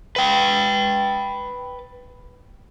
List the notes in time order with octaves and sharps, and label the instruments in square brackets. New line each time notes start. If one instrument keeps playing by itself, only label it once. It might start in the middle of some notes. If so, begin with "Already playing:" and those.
[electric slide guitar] B4 G5